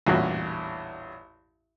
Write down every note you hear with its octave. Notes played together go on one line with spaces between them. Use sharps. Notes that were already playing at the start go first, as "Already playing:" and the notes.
A1 E2 G2 A#2 F#4